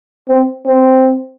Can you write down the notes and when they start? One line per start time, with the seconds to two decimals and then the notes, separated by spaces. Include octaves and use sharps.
0.28 C4
0.66 C4